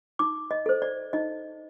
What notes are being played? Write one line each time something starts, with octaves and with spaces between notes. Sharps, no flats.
D#4 D6
D#5
A4 C5
D5
D#4 D#5